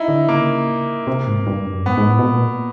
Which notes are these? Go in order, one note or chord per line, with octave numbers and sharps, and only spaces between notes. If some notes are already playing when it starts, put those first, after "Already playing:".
Already playing: D#4 E4
D3
C#3 A#3
C3
G#2
G2
F#2
G#2 B3
G#2
A2
B2
A#2